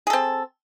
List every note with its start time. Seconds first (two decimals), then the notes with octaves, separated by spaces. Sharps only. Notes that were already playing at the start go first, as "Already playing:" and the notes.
0.07 G#4
0.10 A4
0.13 C4